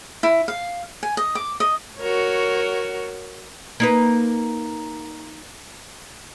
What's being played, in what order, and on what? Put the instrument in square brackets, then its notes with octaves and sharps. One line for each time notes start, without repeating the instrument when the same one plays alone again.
[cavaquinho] E4
F5
G#5
D#5
D6
D#5
[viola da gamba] F#4 A#4 C#5
[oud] A#3 D#4 B4